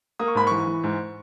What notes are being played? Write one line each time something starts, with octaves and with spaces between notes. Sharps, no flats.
A#3 D#6
C#6
G#2 B5
E3 C#6
E3
G#2